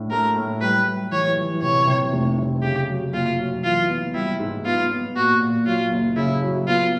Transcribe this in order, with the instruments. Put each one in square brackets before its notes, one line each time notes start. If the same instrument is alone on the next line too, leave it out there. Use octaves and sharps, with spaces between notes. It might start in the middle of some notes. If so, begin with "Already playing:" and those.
Already playing: [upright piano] A2 D4
[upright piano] A3 [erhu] A#4
[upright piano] A2
[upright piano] G3 [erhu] B4
[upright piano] G3
[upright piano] E3 [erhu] C#5
[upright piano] E3
[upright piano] C3 [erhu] C#5
[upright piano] C3
F1
C3
[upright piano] C#3 [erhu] G4
[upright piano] F#3
[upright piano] F#1 [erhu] F4
[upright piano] F#3
[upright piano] E3 [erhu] F4
[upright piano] B3
[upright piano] G3 [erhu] E4
[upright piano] G#2
[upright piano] B3 [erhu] F4
[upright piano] B3
[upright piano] A#2 [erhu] F#4
[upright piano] A#2
[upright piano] F#3 [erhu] F4
[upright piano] F#1
[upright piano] C#3 [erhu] E4
[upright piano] F#3
[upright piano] B3 [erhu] F4